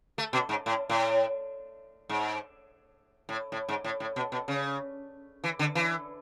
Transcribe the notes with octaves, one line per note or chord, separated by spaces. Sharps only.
A3
B2
G#2
A2
A2
G#2
A2
A2
G#2
A2
A2
B2
B2
C#3
E3
D3
E3